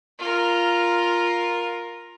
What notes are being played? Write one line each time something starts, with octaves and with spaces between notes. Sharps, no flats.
F4 A#4